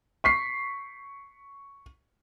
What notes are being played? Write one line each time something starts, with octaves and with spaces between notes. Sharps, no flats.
C#6 B6 C7